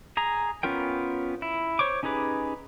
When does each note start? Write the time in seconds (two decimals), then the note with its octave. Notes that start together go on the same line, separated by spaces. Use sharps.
0.17 G#4 A#5
0.63 B3 C#4 F4 A#4 G5
1.42 E4
1.79 C5 C#5 C#6 D6
2.03 C#4 D#4 G4 G#4 B4